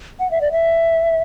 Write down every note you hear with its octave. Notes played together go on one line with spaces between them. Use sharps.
F#5
E5
D5
E5